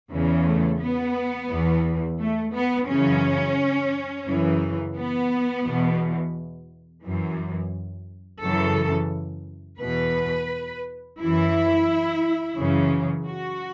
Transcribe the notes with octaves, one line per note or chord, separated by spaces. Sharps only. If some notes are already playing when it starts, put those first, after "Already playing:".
E2 C#3 E3
A3
B3
E2 E3
A3
B3
F#2 C#3 E3 C#4
F#2 C#3 E3
B3
E2 B2
F#2 E3
F#2 C#3 E3 A4
E2 B2 B4
F#2 E3 E4
F#2 C#3 E3
F#4